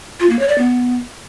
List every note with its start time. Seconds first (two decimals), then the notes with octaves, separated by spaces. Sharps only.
0.20 F4
0.29 A#3
0.39 C#5
0.48 D5
0.58 B3